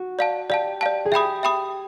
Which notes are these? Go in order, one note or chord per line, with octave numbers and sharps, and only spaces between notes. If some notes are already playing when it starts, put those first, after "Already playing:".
Already playing: F#4
D5 F5 A5
G4 D5 F5 A5
D5 F5 A5
G#4
G4 E5 G5 B5 D#6
E5 G5 B5 D#6